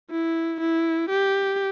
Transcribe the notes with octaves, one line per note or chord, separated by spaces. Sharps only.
E4
E4
G4